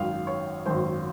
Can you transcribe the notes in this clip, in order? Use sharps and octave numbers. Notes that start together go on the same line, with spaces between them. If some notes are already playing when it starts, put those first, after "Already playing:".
Already playing: G#1 F#2 D#3 F5
C#5
G#1 F#2 D#3 C5